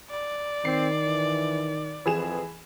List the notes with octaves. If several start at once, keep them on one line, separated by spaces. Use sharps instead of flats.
D5
D#3 C4 C7
E3
F2 E3 G#4 E7